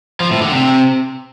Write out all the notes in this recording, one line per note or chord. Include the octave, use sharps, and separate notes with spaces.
F3
A2
D3
C3